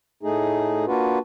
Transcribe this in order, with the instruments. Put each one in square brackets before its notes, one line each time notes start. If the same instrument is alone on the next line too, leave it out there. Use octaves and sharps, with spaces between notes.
[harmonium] A2 A3 D#4 G#4
A#3 D4 F4 F#4 B4